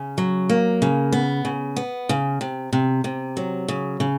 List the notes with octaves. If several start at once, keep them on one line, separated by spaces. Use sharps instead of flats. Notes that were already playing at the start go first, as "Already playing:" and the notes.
Already playing: C#3
F#3
A#3
C#3
B3
C#3
B3
C#3
C3
C3
C3
F#3
C#3
C#3